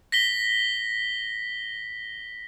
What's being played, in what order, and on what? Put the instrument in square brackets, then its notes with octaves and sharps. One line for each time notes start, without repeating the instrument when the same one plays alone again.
[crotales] A#6 B6 G7